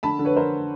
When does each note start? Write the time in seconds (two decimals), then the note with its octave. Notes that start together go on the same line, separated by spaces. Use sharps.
0.03 D3 A5 B5
0.19 D3
0.25 B4 C#5
0.36 D3 A#4 C5